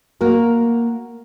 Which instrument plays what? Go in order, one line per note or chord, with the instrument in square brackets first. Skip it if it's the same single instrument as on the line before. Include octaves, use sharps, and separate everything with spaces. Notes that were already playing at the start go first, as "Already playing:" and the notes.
[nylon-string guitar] A#3 F#4 A#4